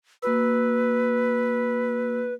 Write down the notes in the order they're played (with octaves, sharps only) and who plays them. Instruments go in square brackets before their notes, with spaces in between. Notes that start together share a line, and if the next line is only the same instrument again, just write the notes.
[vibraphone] A#3 F#4 E6 [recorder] B4